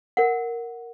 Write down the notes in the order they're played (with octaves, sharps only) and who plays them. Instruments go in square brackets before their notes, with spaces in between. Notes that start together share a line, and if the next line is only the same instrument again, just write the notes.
[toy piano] A#4 F#5